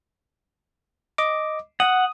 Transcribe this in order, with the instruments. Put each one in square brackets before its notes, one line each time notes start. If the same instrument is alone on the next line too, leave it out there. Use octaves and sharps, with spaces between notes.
[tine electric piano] D#5 D6
[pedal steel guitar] F#5 [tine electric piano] D#6